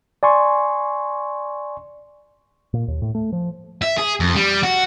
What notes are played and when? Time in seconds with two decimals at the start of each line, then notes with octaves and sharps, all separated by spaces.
0.23 D5 G#5 C6 C#6
2.74 A#2
2.88 D#2
3.02 A2
3.15 A3
3.33 F3
3.82 E5
3.98 G#4
4.20 F2
4.35 G3
4.63 F#4